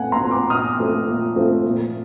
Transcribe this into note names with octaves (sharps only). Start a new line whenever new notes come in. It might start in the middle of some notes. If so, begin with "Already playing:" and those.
Already playing: A#2 F3 A3 C4 F#5 G#5
A#5 C6
F3 A3 C4
C6 D6
A#2 D#6 F6
F3 A3 C4
A#2
F3 A3 C4
A#2